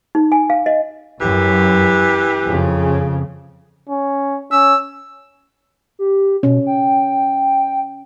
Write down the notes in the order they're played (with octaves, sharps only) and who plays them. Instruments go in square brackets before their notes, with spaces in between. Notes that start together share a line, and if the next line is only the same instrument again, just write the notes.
[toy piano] D#4
G#5
F5
D#5
[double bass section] F#2 [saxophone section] E3 G4
[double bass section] F2 C#3
[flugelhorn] C#4
[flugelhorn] C#4 [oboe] E6
[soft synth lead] G4
[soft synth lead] B2 [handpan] C#4
[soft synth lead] G5